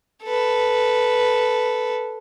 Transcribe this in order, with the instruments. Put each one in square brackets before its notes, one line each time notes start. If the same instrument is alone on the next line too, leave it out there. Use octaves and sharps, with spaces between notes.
[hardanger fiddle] A4 B4